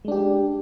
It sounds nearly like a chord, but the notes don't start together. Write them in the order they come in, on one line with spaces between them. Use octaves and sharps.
G#3 D4 G4